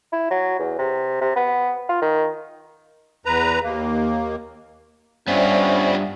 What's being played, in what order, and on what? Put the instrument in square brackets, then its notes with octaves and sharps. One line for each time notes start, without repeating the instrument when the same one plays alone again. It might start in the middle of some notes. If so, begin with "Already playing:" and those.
[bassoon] E4
F#3
E2
C3
C3
B3
F4
D#3
[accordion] E2 B4 A#5
D#2 A#3
[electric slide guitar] G2 [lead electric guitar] B3 F4 [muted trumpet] C#4 [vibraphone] C5 D5 E5